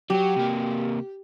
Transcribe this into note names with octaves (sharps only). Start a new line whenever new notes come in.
F#3 F#4 G4
C3 A#3